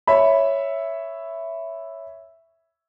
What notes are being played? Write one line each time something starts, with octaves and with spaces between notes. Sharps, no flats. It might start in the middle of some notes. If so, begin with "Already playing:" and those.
C#5 E5 B5